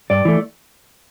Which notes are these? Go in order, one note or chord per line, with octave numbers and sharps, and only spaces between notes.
G2 D5
E3 A3